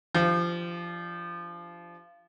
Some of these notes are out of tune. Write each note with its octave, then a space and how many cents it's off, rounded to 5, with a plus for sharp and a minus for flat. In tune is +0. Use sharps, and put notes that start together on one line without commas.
F3 -20 D4 +0 G4 +0